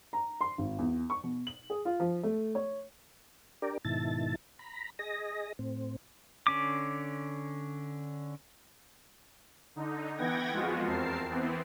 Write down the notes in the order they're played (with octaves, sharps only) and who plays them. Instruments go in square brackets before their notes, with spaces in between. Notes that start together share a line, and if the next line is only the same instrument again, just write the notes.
[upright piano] A#5
C6
G#1
E2
C#6
B2
F#7
G#4
F4
F3
A3
C#5
[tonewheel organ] D4 G4 A#4 D5
G#2 B2 D#3 E4 A5 A6
A#5 B5
G#4 D#5 A#6
A2 C4
[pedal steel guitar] D3 C#4 D6
[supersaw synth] D3 D#4
E3 B3 F#5 G5 G#6 A#6
F2 G#3 B3 F4 F#4
E2 C4 A#4 A5 C7
E3 B3 C4